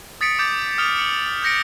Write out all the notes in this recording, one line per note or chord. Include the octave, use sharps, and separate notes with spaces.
D#6 A6 B6 C#7 D7
D6 G6 A6
D#6 F6 A6 C#7 F7 G7
C#7 F#7
F6 G6 A#6 C#7 D7